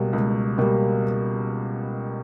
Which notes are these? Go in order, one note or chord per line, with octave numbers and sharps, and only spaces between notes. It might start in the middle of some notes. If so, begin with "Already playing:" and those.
Already playing: C#2 B2 G3 A#3
C#2
B2 G3 A#3